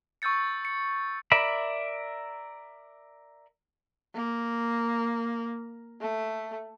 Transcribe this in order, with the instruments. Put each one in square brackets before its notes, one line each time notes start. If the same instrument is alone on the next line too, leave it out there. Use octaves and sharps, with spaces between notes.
[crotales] C#6 E6 G6 A6 C#7
C#7
[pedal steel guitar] A#4 D5 E5 B5
[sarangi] A#3
A3